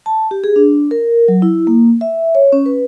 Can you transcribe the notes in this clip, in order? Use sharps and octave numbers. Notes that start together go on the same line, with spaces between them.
A5
G4
G#4
D4
A#4
F#3
E4
A#3
E5
C#5
C#4
B4